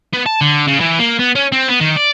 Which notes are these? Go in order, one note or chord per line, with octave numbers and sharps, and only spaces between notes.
B3
A5
D3
C#3
E3
A#3
B3
C#4
C4
B3
D#3
D5